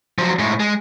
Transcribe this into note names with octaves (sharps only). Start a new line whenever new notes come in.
F3 F#3
A2 G#3
G#3